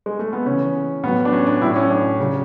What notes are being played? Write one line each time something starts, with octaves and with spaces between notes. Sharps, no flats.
G#3
A3
B3
C#3 E3 C#4
A2 F#3 B3
D4
C#4
D4
A2 F#3 E4
C#4
D4
C#3 F#3